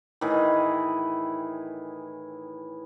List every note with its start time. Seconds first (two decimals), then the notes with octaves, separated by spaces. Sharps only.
0.21 A2 D#3 E3 G#4